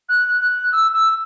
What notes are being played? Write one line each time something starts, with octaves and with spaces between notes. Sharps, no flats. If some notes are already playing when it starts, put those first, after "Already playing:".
F#6
F#6
E6
E6